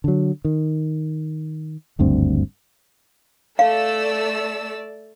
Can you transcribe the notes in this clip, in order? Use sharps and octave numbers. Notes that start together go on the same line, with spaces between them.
D3 F#3
D#3
F#1 D2 G2 C4
A3 D5 F5 E6